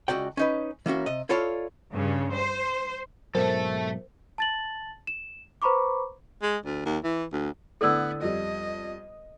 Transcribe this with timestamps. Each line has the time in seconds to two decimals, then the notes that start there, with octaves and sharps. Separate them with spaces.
0.08 C#2 C#3 F#4 D5 G5
0.37 C#4 D#4 B4
0.86 E3 A#3 C#4 F#4
1.06 C3 D#5
1.29 E4 F4 A4 C#5 D5 F5
1.93 G2 C#3
2.35 C5
3.35 G#2 B2 F#3 A4 A#4 C5 E5
4.38 A5 A6 F#7
5.07 E7
5.62 B4 C5 A#5 B5 C#6 D6
6.42 G#3
6.66 D2
6.85 D#2
7.04 E3
7.33 D2
7.81 A2 D3 B3 A4 D5 E6
8.22 F2 G3 D#5